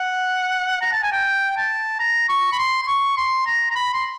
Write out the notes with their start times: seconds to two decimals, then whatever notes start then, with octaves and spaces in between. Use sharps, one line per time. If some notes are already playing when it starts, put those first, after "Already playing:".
Already playing: F#5
0.81 A#5
0.92 A5
1.03 G#5
1.12 G5
1.57 A5
2.00 A#5
2.29 C#6
2.52 B5
2.59 C6
2.83 C6
2.87 C#6
3.17 C6
3.46 A#5
3.71 A#5
3.75 B5
3.93 C6